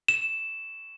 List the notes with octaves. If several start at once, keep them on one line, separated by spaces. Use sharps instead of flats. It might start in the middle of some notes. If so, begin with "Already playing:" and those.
E7